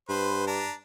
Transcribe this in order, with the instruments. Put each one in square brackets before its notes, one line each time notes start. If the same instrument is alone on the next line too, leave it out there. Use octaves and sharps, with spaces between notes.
[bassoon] G2 [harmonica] B4 C5
[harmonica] D4 A#5